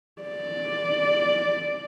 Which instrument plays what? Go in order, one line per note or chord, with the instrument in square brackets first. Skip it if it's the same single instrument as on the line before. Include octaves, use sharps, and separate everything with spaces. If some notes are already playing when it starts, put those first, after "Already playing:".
[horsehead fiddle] D5